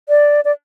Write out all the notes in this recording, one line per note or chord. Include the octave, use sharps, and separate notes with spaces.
D5
D5